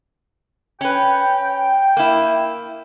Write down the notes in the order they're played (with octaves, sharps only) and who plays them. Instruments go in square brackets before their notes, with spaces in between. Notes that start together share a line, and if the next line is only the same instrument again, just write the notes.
[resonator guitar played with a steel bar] C#4 B4 [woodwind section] G5
[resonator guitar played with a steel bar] A#3 E4